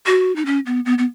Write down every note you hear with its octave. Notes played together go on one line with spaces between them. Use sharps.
F#4
D#4
C#4
B3
B3
B3